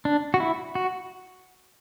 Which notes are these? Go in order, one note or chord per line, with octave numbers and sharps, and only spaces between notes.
D4
F#4
E4
F#4